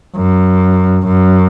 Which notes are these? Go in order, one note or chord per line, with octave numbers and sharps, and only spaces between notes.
F#2
F#2